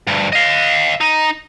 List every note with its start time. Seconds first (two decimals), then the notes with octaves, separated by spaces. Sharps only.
0.07 D2 G2
0.33 D#5 F5
1.01 D#4